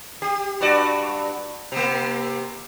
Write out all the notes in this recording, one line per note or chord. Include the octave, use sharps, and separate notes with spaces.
G4
G2 F#4 D5
C3 A#3